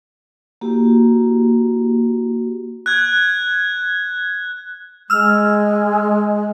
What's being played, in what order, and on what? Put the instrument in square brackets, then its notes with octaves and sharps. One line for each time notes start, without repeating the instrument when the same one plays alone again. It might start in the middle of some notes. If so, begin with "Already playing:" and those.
[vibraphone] A#3 E4 F#4 G4
[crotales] F#6 G#6
[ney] G#3 [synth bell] E6 F6